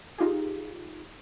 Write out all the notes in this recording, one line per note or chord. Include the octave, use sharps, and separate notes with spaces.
D#4 F4 G4 G#4